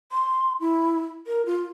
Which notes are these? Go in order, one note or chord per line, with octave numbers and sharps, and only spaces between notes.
C6
E4
A#4
F4